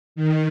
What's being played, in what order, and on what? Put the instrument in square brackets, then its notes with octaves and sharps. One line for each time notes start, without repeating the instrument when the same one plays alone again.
[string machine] D#3